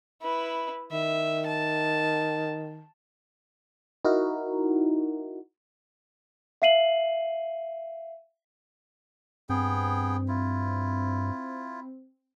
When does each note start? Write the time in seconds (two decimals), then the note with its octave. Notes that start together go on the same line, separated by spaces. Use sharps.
0.22 E4 B4
0.92 D#3 E5
1.46 A5
4.05 D#4 E4 F#4 A#4
6.62 E5 F5 C7 D#7 F#7
9.49 G2 B3 C4 G#4 G5
10.28 E4 F4